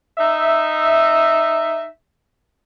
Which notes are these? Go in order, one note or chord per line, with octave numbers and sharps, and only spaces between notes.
D#4 E5